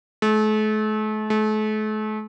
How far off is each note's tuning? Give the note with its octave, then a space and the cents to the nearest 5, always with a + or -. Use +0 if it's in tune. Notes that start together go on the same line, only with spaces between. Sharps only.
A3 -40
A3 -40